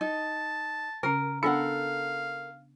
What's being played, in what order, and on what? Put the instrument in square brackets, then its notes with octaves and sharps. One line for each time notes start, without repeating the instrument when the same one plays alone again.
[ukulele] D#4 [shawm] A5
[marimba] C#3 C#4 [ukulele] A#4
[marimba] B3 D4 [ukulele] A4 A#4 F#5 [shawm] F5